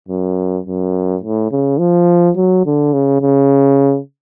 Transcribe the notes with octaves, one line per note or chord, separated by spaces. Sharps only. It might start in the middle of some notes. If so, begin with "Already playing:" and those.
F#2
F#2
A2
C#3
F3
F#3
D3
C#3
C#3